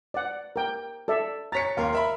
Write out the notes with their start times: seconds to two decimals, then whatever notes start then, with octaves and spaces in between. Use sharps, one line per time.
0.14 D5 F#5
0.56 A#4 G5
1.08 A4 D5 E5
1.52 C#5 A#5 A6 B6 C#7
1.77 D#2 A#4 F5 C6
1.92 A#4 E5 B5